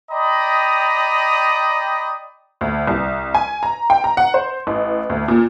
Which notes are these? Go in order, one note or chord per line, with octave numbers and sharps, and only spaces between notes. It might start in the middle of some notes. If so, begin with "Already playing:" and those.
D5 D#5 G5 A#5 B5 D#6
D2
C2
G#5
A#5
G5
A#5
F#5
C5
A1
D2
A#2